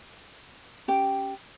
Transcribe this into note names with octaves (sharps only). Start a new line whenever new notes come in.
C#4 G4 G5